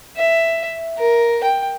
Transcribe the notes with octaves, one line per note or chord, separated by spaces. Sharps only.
E5
A#4
G5